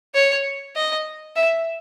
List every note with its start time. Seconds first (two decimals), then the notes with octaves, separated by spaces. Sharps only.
0.15 C#5
0.76 D#5
1.36 E5